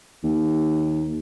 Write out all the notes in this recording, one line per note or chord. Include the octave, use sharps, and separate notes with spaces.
D#2